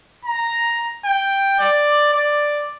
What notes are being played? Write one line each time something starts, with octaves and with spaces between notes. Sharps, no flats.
A#5
G5
D5
D5